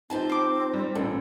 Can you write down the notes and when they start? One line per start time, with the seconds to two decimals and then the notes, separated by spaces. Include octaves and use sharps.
0.10 D#3 F3 C4 G4 A5
0.30 C6 D6
0.74 G3
0.95 A1 A#2 D4 A4